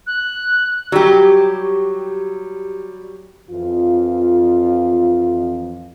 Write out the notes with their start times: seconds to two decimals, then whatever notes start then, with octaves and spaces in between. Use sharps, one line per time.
0.07 F#6
0.92 F#3 G3 G4
3.49 F2 E3 F4